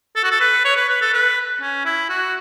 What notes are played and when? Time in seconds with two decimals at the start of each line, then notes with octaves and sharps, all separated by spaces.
0.16 A4
0.24 F#4
0.31 A4
0.40 B4
0.65 C#5
0.77 B4
0.89 B4
1.02 A4
1.14 B4
1.61 C#4
1.85 E4
2.09 F#4